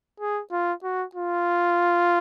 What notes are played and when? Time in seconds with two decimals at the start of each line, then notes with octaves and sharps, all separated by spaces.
0.20 G#4
0.51 F4
0.83 F#4
1.15 F4